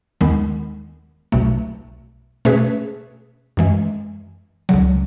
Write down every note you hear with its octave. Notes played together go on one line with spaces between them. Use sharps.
D#2 D#3 G#3 B3
B1 B2 A3
B2 A3 C#4 G#4 B4
F#2 E3 G#3
C#2 C#3 F#3